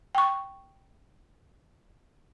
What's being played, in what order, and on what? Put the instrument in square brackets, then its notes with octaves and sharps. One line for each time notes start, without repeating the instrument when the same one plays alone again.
[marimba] G5 C#6